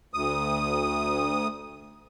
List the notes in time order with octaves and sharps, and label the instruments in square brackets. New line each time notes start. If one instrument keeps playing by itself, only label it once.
[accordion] D2 D#6